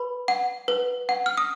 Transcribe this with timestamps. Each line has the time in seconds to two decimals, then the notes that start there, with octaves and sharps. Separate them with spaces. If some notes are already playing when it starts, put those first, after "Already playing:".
Already playing: B4 B5
0.28 F#5
0.68 B4
1.09 F#5
1.26 F6
1.37 D#6